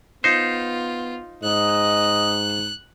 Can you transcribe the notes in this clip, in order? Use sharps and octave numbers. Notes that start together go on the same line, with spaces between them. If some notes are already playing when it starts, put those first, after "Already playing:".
B3 D#4 F4 C5
G#2 D#5 F#6